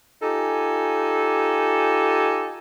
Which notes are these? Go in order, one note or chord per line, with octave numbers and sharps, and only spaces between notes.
D#4 F4 G4 A4 G#5